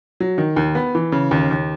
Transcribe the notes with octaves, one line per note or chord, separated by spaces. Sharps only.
F#3
D#3
D#2
B3
E3
C#3
D#2
D#2